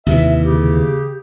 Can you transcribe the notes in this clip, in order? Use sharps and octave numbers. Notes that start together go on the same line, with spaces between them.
D#2 C3 E3 E5
C#3 G4